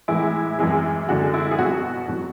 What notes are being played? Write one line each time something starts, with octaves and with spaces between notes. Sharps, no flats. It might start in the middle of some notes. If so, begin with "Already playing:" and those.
A2 E3 G#3 E4
F#2 E3 G#3
F#2 D3 G#3 F#4
E4
G#4
B2 F#3 F#4
B2 F#3